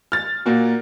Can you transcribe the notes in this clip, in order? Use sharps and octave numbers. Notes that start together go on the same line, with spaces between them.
F6 A6
A#2 A#3 F#4